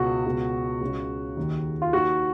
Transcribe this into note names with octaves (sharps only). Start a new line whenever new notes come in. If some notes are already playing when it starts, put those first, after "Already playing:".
Already playing: C#2 B2 F#4
C#2 B2
C#2 C#3
D#2 D#3
F4
D#2 D#3 F#4